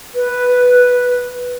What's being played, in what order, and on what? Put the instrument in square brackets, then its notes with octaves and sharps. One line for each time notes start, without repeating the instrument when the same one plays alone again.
[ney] B4